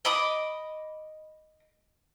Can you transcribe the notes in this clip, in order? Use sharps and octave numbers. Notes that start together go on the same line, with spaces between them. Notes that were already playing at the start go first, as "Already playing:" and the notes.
D#5 B5 D6 D#6